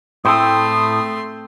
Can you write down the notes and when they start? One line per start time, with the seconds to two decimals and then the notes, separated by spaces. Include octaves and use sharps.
0.25 A2 A3 C4 E4 A4 G5 C6 D#6